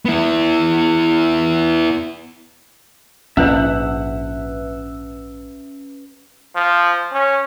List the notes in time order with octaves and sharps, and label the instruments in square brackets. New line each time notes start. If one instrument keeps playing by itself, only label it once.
[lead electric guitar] B3 E4
[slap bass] A#1 G#2 [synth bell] C#4 B4 [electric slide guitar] E5 F#5
[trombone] F3
C#4